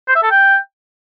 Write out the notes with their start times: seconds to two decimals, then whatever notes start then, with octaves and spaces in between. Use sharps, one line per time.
0.08 C5
0.16 E5
0.23 A4
0.31 G5